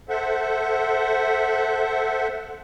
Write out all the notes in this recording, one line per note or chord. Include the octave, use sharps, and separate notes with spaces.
A4 C5 E5 F#5